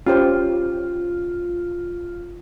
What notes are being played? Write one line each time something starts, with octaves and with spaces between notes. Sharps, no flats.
C#4 F4 G4 C5